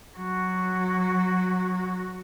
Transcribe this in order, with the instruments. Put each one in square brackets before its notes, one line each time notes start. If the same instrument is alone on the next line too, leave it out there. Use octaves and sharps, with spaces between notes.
[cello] F#3 F#4